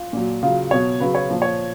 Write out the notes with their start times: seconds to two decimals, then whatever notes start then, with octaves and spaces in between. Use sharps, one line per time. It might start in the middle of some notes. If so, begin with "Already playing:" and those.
Already playing: F4
0.13 A#2 F#3
0.43 C#3 F#3 F4
0.71 B2 F#3 C#5
1.00 C#3 F#3 B4
1.15 C#5
1.30 A#2 F3
1.42 C#5